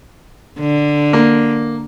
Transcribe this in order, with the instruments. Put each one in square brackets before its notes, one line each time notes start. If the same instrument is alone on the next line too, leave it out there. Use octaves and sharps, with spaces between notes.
[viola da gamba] D3
[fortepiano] A#3